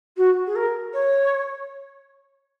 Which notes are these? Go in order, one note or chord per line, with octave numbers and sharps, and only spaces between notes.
F#4
G#4
A#4
C#5